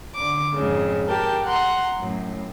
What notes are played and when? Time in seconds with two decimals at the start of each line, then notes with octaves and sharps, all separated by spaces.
0.14 D3 D6
0.54 F2 G#2 C#3
1.07 G4 A#4 G5 A5
1.46 F#5 A#5 C6
1.98 F#2 A2